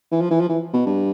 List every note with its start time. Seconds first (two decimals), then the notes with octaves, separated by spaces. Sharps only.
0.11 E3
0.21 F3
0.30 E3
0.40 F3
0.49 E3
0.73 B2
0.86 G2